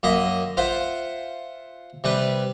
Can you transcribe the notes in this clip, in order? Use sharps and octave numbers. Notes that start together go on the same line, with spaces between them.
F#2 A#3 D#5 E5
F4 C5 E5 F#5
C3 G3 B4